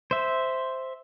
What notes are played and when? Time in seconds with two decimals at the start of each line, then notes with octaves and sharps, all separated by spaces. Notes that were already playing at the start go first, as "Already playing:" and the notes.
0.11 C5 E5